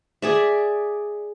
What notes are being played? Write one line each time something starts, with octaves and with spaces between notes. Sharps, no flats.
G#4 D5 E5